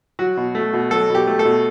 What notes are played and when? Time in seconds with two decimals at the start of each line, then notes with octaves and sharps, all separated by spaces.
0.19 F#3 F#4
0.37 B2
0.55 A3
0.73 B2
0.91 F#3 A4
1.10 B2 G4
1.27 A3
1.39 A4
1.45 B2